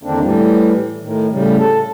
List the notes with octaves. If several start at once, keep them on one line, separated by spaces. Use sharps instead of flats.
E2 D3 D#3 A#3 C4 D4
A2 E3 G3
A2 D#3
A2 C#3 G3
A4